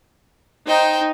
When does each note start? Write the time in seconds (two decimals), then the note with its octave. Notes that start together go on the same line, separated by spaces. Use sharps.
0.67 D#4 C5 G5